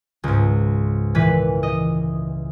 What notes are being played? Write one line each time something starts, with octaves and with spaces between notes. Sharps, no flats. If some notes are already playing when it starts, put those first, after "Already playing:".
C#2 G#2
A#2 E3 B4 B6
D#5